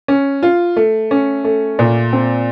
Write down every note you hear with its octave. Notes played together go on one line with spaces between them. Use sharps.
C#4
F4
A3
C#4
A3
A#2
C4